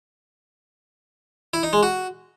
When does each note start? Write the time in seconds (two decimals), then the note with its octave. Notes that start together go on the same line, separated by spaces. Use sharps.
1.54 E4
1.63 D#4
1.73 G#3
1.83 F#4